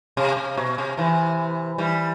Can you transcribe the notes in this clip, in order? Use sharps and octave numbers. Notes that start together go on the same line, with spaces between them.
C3
C3
B2
C3
C3 E3
E3 G3